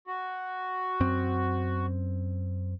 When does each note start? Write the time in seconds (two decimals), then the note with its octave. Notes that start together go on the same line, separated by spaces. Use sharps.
0.07 F#4
1.00 F#2 C4